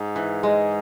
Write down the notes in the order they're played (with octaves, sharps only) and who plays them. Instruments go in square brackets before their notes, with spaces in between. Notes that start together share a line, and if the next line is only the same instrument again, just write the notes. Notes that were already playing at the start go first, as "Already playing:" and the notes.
Already playing: [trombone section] G#2
[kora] E3
G#3